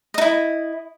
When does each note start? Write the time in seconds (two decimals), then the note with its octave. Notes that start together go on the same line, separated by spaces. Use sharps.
0.14 D#5
0.18 D#4
0.21 E4